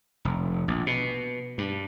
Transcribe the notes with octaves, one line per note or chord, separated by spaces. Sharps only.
F1
A#1
B2
G2